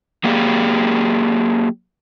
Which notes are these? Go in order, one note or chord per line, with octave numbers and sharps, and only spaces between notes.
F#3 A#3 G4 G#4